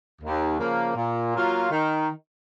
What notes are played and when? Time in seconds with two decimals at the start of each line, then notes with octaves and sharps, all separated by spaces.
0.22 D#2
0.59 C#3 F3 A#3
0.95 A#2
1.34 F#3 A#3 F4
1.71 D#3